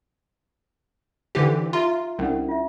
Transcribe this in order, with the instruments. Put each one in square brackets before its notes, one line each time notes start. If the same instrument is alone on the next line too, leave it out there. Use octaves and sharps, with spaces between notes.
[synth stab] D3 E3 G4 [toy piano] D#4 C5
[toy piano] C5
[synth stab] F4 [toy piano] E5 A#5
[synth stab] C2 [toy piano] C#4 D4 F#5
[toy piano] F4 E5